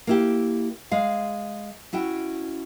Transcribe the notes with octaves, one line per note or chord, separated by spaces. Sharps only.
A#3 E4 G4
G#3 F5
C#4 E4 F#4 G5